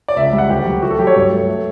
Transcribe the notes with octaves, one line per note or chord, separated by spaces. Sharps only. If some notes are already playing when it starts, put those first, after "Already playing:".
D5
C#2 E5
E5
G3
F#5
D2 G4
F#3
A3 F#4
A4
F#3 G4
C#5
G2
A3
A3